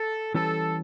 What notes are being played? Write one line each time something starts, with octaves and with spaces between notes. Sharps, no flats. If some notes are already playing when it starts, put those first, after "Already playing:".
Already playing: A4
E3 G3 C#4 G4 A4 B4